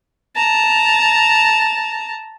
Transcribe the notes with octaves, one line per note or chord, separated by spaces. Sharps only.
A5 A#5